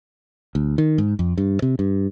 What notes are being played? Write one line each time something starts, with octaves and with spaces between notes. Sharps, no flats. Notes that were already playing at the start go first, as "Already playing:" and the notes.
D2
D#3
G#2
F2
G2
C3
G2